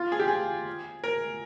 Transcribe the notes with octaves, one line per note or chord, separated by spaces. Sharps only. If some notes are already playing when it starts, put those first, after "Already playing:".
Already playing: F4
G#4
G4
G#4
A#4